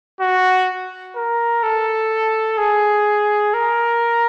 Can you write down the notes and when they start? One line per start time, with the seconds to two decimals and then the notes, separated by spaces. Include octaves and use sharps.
0.21 F#4
1.16 A#4
1.63 A4
2.58 G#4
3.54 A#4